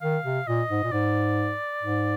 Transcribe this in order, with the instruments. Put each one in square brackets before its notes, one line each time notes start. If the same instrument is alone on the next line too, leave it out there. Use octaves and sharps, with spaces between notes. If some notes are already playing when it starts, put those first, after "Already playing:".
[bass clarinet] D#3 [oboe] F5
[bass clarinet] C3
[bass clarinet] A#2 [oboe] D#5
[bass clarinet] G#2
A#2
[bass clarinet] G#2 [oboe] D5
[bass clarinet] G#2